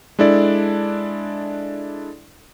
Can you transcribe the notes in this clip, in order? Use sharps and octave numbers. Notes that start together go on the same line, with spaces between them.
G#3 D4 E4 A4 D5